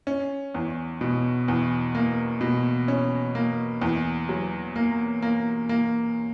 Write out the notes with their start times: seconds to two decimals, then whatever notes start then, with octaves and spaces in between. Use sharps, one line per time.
0.07 C#4
0.54 E2
1.01 B2
1.48 E2
1.95 A#3
2.41 B2
2.88 C#4
3.35 A#3
3.81 E2
4.29 F#3
4.76 A#3
5.22 A#3
5.69 A#3